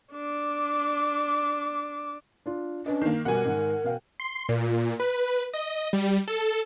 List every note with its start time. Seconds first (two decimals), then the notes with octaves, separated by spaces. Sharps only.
0.13 D4 D6
2.46 D4 F4
2.86 C#4 D4 B4 D#5
3.02 D#3 A#3 C7
3.25 B2 G3 A#4 F#5 G#5
3.45 G#2 D#3
3.84 B2 F5 G5
4.20 C6
4.49 A#2
5.00 B4
5.53 D#5
5.93 G3
6.28 A4